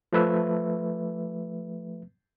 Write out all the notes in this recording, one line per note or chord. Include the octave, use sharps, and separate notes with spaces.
F3 A3 B4 E5